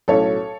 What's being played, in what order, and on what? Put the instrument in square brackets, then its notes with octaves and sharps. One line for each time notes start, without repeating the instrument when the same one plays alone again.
[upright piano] B1 A2 F#3 C#4 A4 C#5